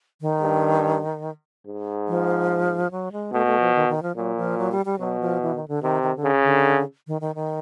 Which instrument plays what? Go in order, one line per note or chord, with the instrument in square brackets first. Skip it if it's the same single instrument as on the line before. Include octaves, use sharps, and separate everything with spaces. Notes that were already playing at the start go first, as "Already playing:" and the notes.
[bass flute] D#3
[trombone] G2
G#2
[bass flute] F3
F#3
G#3
[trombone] B2 [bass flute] A3
[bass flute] A3
F3
D#3
D#3
F3
[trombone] A#2 [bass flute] F#3
[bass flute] F3
F#3
G3
G3
[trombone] B2 [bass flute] F#3
[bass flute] F3
E3
D#3
D3
[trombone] C3 [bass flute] D#3
[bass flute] D#3
D3
[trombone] C#3
[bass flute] D3
D#3
D#3
D#3